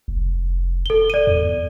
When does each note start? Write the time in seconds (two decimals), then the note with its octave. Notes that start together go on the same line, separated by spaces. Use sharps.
0.08 F1
0.86 A4 G7
1.10 D5 D#7
1.27 E2